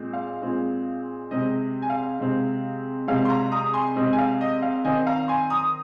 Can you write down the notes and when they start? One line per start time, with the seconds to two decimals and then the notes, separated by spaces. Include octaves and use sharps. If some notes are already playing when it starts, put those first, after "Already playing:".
Already playing: A#2 G#3 C4
0.13 F5
0.42 A#2 G#3 C4
1.31 C3 G#3 C4 D#5
1.82 G#5
1.90 F5
2.19 C3 G#3 C4
3.08 C3 G#3 C4 F5
3.25 C6
3.29 F5 A#5
3.52 A#5 D#6
3.73 G#5 C6
3.96 C3 G#3 C4 D#5
4.13 G#5
4.18 F5
4.41 D#5
4.62 F5
4.84 D#3 C4 D#5 G#5
5.07 F5 A#5
5.28 G#5 C6
5.50 A#5 D#6